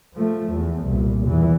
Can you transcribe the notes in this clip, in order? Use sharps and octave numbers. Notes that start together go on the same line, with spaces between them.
F3 A3
E2
C2 A#2
E2 E3